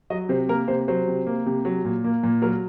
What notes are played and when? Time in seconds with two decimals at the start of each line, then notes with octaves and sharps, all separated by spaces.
0.10 F#3 D#5
0.29 C3 C5
0.49 A#3 A#4
0.68 C3 C5
0.88 F#3 C5
1.08 C3
1.26 A#3
1.46 C3
1.65 F#3
1.85 A#2
2.04 A#3
2.23 A#2
2.42 F#3 A#4